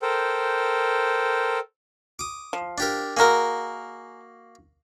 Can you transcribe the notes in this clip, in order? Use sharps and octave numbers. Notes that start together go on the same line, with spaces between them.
A4 A#4 C5 G5
D6 D#6
F3
D4 G4 A#4
A#3 F#4 G#4 A#4 D#5